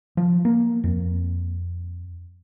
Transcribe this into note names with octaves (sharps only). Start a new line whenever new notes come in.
F3
A#3
F2